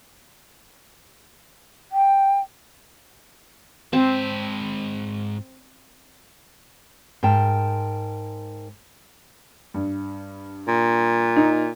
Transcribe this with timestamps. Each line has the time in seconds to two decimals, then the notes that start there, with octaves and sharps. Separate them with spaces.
1.91 G5
3.93 G#2 C4 A5
7.23 G#2 A#4 G5 A5
9.74 G2
10.68 A#2
11.36 D#4